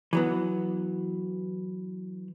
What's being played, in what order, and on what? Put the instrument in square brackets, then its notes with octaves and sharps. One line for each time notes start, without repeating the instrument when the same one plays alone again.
[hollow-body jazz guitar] E3 F#3 B3